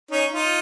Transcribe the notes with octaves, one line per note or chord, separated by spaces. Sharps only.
C#4 D#4
D#4 F4